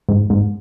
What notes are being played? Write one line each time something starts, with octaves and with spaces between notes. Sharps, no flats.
G#2
G#2